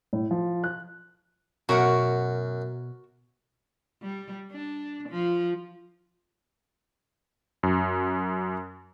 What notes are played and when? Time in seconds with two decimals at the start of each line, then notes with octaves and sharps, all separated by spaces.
0.13 A2
0.31 F3
0.64 F#6
1.69 F#2 B2 F#4 A#4 F#5
4.02 G3
4.51 D4
5.09 F3
7.63 F#2